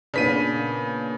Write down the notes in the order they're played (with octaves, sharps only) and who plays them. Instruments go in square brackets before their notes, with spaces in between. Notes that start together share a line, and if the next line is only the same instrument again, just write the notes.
[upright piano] A#2 B3 D4 [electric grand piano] C#3 B6 D#7